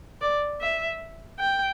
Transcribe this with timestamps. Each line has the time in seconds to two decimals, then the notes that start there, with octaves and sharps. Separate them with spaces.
0.22 D5
0.61 E5
1.40 G5